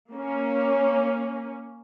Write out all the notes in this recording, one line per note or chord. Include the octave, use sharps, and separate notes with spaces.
A#3 C#4